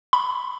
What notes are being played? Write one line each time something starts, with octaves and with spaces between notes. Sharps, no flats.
B5